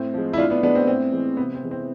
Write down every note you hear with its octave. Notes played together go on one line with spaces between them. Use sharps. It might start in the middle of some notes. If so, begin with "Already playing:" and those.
Already playing: A2 C4
F3 G#3
E4
A2 D4 F4
B3 D4
G#3 B3 D4
C4
A2 C4
E3 G#3
C3 B3
C4
E3 G#3
C4